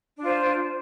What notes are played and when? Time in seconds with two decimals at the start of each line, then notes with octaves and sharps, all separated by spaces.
0.17 D4
0.22 F4
0.26 C5